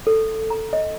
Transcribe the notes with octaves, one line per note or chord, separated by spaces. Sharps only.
A4
A#5
D#5